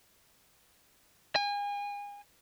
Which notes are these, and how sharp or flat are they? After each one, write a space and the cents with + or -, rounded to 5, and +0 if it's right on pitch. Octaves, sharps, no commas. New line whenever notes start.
G#5 -35